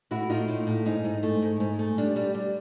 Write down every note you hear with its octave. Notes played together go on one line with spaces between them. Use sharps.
A2 E4 F#4
A2 D#4 F4
A2
A2
G#2 D#4
G#2
A3
G#2
G#2
A3
G3 D4
G3
G3